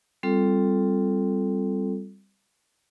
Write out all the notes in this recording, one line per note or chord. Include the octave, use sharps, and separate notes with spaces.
G3 C4 F4 A4